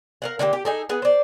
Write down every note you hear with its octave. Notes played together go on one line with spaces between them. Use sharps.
A#4 F5 F#5
D3 A3 A#3 G4
G4
D#4 G#4 A4
B3 G#4
C5 D5